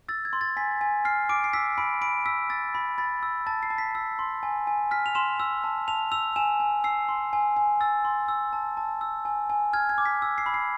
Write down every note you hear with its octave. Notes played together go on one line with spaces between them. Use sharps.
E6 A6
G#6
C6
A6
G#5 B6
G#5
F6 C7
D6 D7
C7
E6 B6
B5 D7
B5 D7
E6 B6
E6 A6
B5
B5 A6
E6
A5 A6
C7
A5
B6
E6
C6
G#5
G#5
F6 B6
F7
C6 E7
E6
A5
A5 F7
E6 F7
G#5 E7
G#5
E6 C7
C6
G#5
G#5
E6 A6
C6
E6
A5
A5
E6
G#5
G#5
F6 G#6
G#6
D6
B6
E6
C7
B5
C7